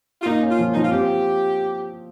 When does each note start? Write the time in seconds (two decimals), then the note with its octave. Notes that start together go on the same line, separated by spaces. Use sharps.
0.22 F4
0.26 A#3 D#4
0.43 C#4
0.49 F4
0.59 F3
0.73 F3 D#4
0.82 F4
0.91 C4 G4